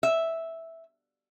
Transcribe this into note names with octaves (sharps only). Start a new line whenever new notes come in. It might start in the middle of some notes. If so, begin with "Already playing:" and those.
E5